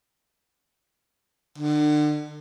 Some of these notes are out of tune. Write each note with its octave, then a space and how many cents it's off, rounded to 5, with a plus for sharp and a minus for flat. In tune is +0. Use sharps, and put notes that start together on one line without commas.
D3 +35